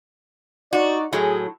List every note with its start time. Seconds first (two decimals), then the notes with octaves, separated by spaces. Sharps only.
0.73 D#4 F#4 D5
1.13 A2 F#3 G#4